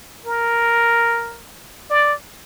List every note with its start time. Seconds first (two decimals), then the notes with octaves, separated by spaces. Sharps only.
0.26 A#4
1.90 D5